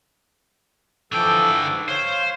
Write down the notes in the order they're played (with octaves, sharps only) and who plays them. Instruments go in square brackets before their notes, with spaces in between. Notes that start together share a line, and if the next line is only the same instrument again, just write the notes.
[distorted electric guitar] D3 G5 [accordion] E3 F3 A4
[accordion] G#2
[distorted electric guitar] C5 [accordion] C#5 F5